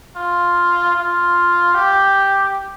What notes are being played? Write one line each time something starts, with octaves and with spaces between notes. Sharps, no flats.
F4
F4
G4